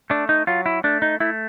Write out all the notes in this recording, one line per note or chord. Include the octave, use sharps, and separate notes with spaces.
A3 D4
D#4
F#3 F4
E4
A3 D4
D#4
A3 E4